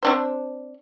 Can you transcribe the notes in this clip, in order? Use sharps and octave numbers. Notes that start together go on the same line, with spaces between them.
C4 D4 C5